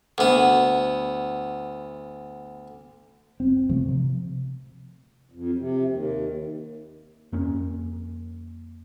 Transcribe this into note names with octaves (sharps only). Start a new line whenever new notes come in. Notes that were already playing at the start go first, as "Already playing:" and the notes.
D2 B3
F#1 C4
C3 F3 A3 C4
C3
F2
C3
D#2
F2 A#3 C#4